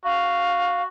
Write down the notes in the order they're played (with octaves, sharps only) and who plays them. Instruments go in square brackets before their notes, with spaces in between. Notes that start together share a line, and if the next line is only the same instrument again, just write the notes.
[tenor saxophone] F#4 [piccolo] F5